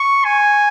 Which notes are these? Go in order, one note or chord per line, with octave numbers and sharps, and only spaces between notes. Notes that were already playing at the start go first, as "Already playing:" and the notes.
Already playing: C#6
G#5